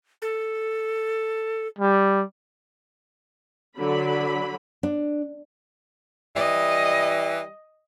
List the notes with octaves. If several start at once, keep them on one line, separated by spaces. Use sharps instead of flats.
A4
G3
D3 F#3 B5
D4
E3 G3 D#5